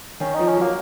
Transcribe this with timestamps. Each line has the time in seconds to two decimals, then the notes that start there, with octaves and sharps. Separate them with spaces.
0.20 D#3 C#4
0.34 F3 D#4
0.48 C#4
0.57 F#3 A#3